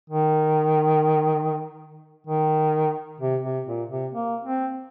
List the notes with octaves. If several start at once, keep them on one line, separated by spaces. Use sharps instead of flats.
D#3
D#3
C3
C3
A#2
C3
A#3
C4